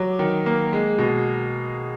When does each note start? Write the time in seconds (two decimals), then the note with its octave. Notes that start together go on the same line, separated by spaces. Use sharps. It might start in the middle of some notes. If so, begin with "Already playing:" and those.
Already playing: F#3 D6
0.19 D#3
0.46 A#3
0.73 G#3
0.98 B2